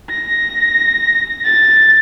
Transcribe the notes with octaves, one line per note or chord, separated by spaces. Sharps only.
A#6
A6